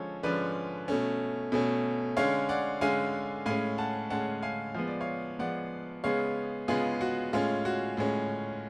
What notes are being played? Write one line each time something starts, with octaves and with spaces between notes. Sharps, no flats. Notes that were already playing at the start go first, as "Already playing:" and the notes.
Already playing: D3 F3 G#3 C#4 A4 C#5
D3 F3 G#3 C#4 B4 D5
B2 A3 C#4
B2 A3 C#4
D3 G#3 C#4 C#5 F5
D5 F#5
D3 G#3 C#4 F5 G#5
A2 G#3 C#4 F5 G#5
F#5 A5
A2 G#3 C#4 F#5 A5
F5 G#5
F3 G#3 B3 F5
D5
C#5 F5
F3 G#3 B3 D5 F#5
C#3 G#3 B3 C#5 F5
C#3 G#3 B3 F4 G#4
F#4
A2 G#3 C#4 F4
F#4
A2 G#3 C#4